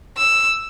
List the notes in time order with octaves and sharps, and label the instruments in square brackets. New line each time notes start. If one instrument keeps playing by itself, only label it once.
[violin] E6